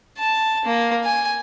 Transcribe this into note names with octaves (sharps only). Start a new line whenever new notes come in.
A5
A#3
G#5